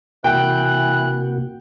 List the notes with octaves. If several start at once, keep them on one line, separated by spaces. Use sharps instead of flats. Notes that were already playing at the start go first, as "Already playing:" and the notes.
C3 E3 A#3 F#4 G5 F#6